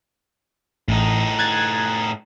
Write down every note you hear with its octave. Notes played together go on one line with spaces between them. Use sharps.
A1 A2 D#4
F#6 G#6 A6